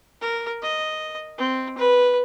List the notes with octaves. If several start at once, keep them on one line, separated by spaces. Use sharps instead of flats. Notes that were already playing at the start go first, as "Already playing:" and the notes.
A#4
D#5
C4
B4